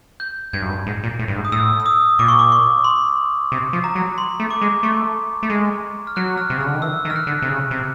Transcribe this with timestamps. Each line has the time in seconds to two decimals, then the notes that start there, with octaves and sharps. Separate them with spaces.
0.20 G6
0.53 G2 G#6
0.62 F#2
0.69 G2
0.87 G#2
1.04 A#2
1.19 A2
1.28 G2
1.36 G#2
1.45 D#6
1.52 A2 E6
1.80 E6
1.86 D#6
2.19 A#2 D6
2.28 C#6
2.39 D6
2.52 C#6
2.84 C6
3.52 C3
3.73 F3
3.84 A#5
3.95 F#3
4.18 C6
4.40 A3
4.51 D6
4.61 G#3
4.83 A3 C#6
5.43 A3
5.50 G#3
6.07 F6
6.16 F#3 F#6
6.37 F6
6.50 C3
6.57 C#3 F6
6.66 D3
6.75 D#3 F6
6.82 E3 E6
7.05 D#3
7.10 F6
7.16 F#6
7.27 D3
7.42 C3
7.49 C#3
7.71 C3